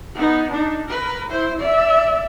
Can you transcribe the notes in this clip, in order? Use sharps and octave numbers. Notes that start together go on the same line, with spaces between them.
B3 D#4
D4 D#4
A#4 B4
E4 C5
D5 E5